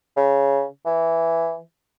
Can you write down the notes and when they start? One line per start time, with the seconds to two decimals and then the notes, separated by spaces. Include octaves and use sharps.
0.16 C#3
0.86 E3